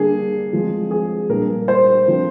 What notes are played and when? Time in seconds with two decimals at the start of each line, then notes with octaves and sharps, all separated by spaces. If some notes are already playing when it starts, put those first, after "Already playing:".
Already playing: D3 G3 A#3 D4 G#4
0.53 F3 G#3 C4
0.91 G#4
1.29 A#2 G3 A#3 D4 A#4
1.68 C5
2.07 D3 F3 C4